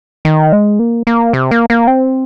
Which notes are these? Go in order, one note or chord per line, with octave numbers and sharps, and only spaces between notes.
D#3
G#3
A#3
A#3
C3
A#3
A#3
C4